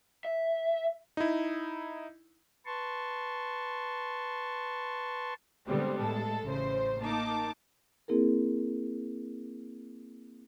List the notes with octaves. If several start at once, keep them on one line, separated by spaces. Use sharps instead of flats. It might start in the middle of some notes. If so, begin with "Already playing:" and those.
E5
D#4 E4
B4 A5 C6 C#6
D3 G3 G#3 B3 C4
A2 G#3 A4
A1 C#3 C5
A#3 D#4 A5 D6
A#3 C4 E4 G#4 A#4